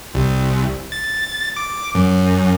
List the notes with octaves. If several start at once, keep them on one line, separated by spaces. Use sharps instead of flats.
C2
A6
D6
F#2